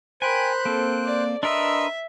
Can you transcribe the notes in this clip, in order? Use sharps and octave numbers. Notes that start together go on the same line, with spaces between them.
A#4 C5 G5 G#5 B5 F#6
A#3 C4 A4
D5
D4 A#4 B4 D#5 E5 C6 E6